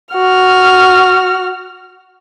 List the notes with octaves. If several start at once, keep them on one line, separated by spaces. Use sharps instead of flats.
F#4 F6